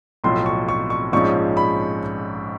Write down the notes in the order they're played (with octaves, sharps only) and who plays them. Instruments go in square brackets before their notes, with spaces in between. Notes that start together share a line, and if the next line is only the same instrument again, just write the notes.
[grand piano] B1 A2 F3 C6
C#6
C#6
C#6
A#1 G#2 F3 G#3 C#4 C#6
B5